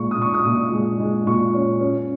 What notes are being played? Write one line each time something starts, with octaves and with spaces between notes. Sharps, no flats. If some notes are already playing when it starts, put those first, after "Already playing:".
Already playing: A#2 G#3 C#6
D#6
A#2 C#6
D#6
A#2
G#3
G#3
A#2 C#6
C#4
C#4